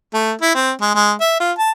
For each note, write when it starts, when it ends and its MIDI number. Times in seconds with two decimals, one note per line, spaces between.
0.14 0.32 57
0.42 0.53 64
0.55 0.72 60
0.81 0.92 56
0.95 1.12 56
1.20 1.36 76
1.40 1.52 65
1.58 1.71 81